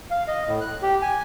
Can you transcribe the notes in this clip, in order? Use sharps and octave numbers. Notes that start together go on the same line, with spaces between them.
F5
D#5
A2
F#6
G4
G#5